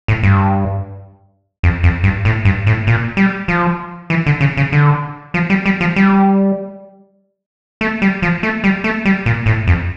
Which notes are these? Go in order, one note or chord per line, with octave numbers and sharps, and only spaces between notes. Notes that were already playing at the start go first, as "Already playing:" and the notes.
A2
G2
F2
F2
G2
A2
G2
A2
A#2
G3
F3
E3
D3
C#3
C#3
D3
F3
G3
G3
F3
G3
A3
G3
F3
A3
G3
A3
G3
A#2
A2
F2